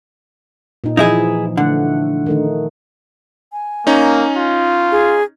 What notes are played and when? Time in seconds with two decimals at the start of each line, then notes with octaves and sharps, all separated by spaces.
0.84 A#2 D#4
0.97 E3 F3 D#4 E4 G#4
1.57 D3 A3 F#5
2.26 D#3 A3 D#4
3.52 G#5
3.87 A#3 C#4 D#4
4.37 F4
4.92 G#4